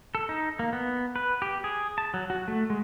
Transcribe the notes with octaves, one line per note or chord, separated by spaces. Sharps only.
A4
D#4
A#3
B3
B4
G4
G#4
A5
F#3
F#4
A3
G#3